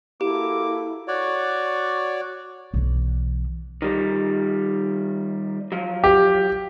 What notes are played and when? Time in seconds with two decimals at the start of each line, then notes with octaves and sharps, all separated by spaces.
0.21 A#3 E4 F#4 G4 A4 D6
1.08 F#4 C#5 D5
2.74 B1 E3
3.82 D#3 G3
5.72 F3 F#3
6.04 G4